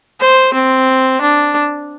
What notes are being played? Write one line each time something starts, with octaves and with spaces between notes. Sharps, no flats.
C5
C4
D4